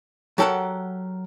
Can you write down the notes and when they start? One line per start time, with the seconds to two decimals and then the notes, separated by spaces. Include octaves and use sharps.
0.38 F#3 G4 A4 A#4 F#5